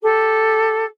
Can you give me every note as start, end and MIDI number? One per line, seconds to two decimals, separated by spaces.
0.02 0.84 67
0.02 0.84 69